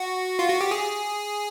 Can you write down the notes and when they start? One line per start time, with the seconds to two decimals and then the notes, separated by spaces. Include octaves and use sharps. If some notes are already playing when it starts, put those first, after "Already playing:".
Already playing: F#4
0.39 F4
0.49 F#4
0.61 G4
0.71 G#4